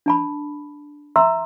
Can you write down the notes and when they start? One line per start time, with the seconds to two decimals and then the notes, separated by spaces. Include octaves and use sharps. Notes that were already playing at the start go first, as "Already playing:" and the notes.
0.06 D4 A5 B5
1.16 E5 A#5 C6 E6